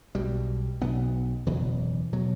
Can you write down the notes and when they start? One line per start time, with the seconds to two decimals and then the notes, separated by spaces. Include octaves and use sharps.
0.15 B1 B2 G3
0.81 B1 B2 B3
1.46 F#1 E2 B2 E3
2.13 B2 F#3